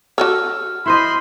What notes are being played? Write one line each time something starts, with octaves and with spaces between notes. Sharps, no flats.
F#4 A4 C#5 E6 F6
E4 C5 D#5 B5 C6